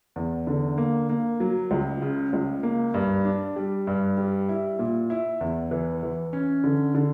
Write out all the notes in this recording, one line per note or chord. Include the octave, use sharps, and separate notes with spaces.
E2
D3
A#3
A#3
F#3
C#2
C#3
C#2
A#3
G2
D4
G3
G2
G3
E4
A#2
E4
E2
E3
E3
C#4
D3
D3